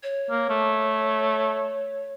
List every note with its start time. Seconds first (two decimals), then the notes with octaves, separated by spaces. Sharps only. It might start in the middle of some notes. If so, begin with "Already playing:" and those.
0.03 C#5
0.30 A#3
0.50 A3